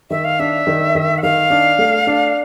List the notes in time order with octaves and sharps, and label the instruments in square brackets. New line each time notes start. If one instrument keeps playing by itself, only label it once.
[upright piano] D#3 [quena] E5
[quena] F5
[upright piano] D4 [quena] E5
[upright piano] D#3
D#3
[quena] F#5
[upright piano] D#3 [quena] F5
[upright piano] D4
A3
D4